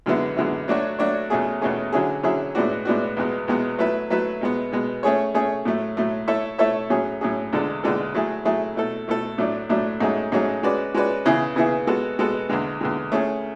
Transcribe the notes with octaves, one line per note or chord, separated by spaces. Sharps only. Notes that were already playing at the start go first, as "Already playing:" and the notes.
F#2 D3 G#3 B3 E4
F#2 D3 G#3 B3 E4
F#3 A3 D4 F#4 C#5
F#3 A3 D4 F#4 C#5
E2 B2 A3 C#4 G#4
E2 B2 A3 C#4 G#4
D3 F#3 C#4 E4 G#4
D3 F#3 C#4 E4 G#4
A2 G#3 B3 D4 F#4
A2 G#3 B3 D4 F#4
E2 B2 G#3 B3
E2 B2 G#3 B3
F#3 A3 E4 B4 E5
F#3 A3 E4 B4 E5
B2 G#3 B3
B2 G#3 B3
A3 C#4 G#4 C#5
A3 C#4 G#4 C#5
A2 F#3 A3
A2 F#3 A3
A3 E4 A4 C#5 E5
A3 E4 A4 C#5 E5
A2 F#3 C#4 G#4
A2 F#3 C#4 G#4
E2 D3 G#3 D4 A4
E2 D3 G#3 D4 A4
F#3 A3 E4 G#4
F#3 A3 E4 G#4
B2 A3 E4 A4
B2 A3 E4 A4
A2 F#3 A3 D4
A2 F#3 A3 D4
G#2 F#3 A3 C#4 G#4
G#2 F#3 A3 C#4 G#4
G#3 C#4 F#4 B4 D5
G#3 C#4 F#4 B4 D5
C#3 E3 B3 E4 G#4
C#3 E3 B3 E4 G#4
G#3 B3 F#4 A4
G#3 B3 F#4 A4
E2 D3 G#3
E2 D3 G#3
A3 C#4 E4 G#4